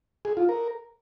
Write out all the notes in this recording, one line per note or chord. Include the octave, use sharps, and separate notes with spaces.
G#4
F4
A#4